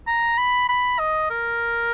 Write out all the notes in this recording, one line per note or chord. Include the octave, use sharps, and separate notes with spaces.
A#5
B5
B5
D#5
A#4